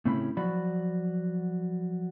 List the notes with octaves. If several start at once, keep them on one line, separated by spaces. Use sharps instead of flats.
A2 C#3 C4 C#4 E4 B5
F3 F#3 F#4 D5 B5